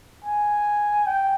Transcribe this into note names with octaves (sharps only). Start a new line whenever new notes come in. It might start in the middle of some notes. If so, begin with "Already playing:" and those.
G#5
G5